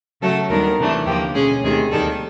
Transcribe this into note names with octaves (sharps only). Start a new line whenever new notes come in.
C#3 F#3 A3 A4
D#2 D#3 G3 B3 D4 A#4
C3 E3 A3 D4
D#2 D3 F3 A#3 G4
B2 G#3 C#4 G#4
D2 C3 D#3 G#4
D#2 D#3 G3 A4